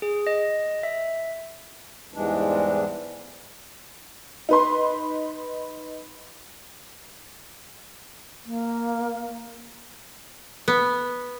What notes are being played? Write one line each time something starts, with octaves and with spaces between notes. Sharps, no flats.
G#4
D#5
E5
E2 G#2 E3 G3 G#3 D4
D#4 B4 C6
A#3
B3